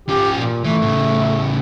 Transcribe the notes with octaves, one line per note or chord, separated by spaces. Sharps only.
F3 C#4 G4
A#2
E3 A3
A2 C#3